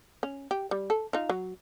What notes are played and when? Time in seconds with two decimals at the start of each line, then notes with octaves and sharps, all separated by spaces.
0.23 C#4
0.51 G4
0.71 G3
0.90 A4
1.13 D#4 F4
1.29 F#3